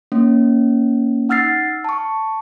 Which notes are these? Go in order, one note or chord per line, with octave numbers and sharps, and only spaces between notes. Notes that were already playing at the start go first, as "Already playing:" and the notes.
A#3 C#4
D#4 F#5 E6 F6 A6 C7
A5 C#6